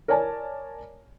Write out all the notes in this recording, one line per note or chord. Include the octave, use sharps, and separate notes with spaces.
A#4 C#5 D5 G#5 A5